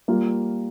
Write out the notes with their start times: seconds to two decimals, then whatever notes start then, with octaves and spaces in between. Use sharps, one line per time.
0.08 G3 A#3 F4